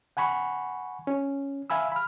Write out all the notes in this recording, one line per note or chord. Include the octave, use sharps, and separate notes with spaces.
F#5 G#5 B5 C#6
C#4
E5 F5 G#5 B5 E6
B5 F6